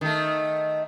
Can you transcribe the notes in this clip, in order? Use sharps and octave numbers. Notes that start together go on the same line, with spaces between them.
D#3 A3